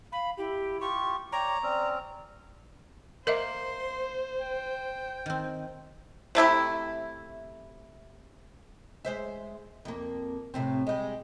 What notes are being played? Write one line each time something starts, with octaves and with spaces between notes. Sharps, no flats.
F5 B5
E4 G4
F4 G4 C#6
C#5 D5 G5 A#5
C4 C#4 D5
A#3 A#4 C5 D#5 E5 C6
G5
D#3 C4
C3 A3 E4 G4
G#3 C5 E5
F2 A#3
A2 C3 C4
G3 G#3